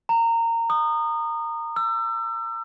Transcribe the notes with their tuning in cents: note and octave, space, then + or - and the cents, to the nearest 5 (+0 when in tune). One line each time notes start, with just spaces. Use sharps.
A#5 -20
D#6 -25
E6 +35